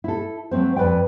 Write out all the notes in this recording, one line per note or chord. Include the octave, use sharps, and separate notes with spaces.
E4 A4
F#3 A3 C4 C5
F2 B4 D5 G5